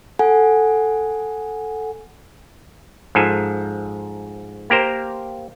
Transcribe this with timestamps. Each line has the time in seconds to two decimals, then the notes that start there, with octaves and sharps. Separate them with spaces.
0.19 A4 F#5 G#5
3.15 G#2 F3 A4 G#5
4.70 A#3 G4 A#4 C5